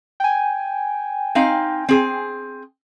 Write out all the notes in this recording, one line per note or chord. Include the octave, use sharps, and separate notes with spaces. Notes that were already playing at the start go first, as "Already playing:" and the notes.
G5 G#5
C4 D#4 F5
C4 G#4